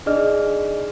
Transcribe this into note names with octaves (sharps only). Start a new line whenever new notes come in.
D4 D#4 G#4 D5 D#5 F6